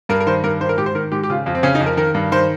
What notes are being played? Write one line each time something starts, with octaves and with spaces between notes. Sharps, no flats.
G2 A#4
A#4
D#3 C5
G2 A#4
D#3 C5
A#4
G#2 G4
C5
D#3 A#4
G#2 G4
G4
C#3 F4
F2 F4
C4
C#3 C#4
D#4
F2
A#4
D#3 A#4
G2
D#3 C5